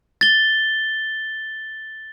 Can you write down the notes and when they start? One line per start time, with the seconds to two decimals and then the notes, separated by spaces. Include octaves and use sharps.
0.21 A6 G7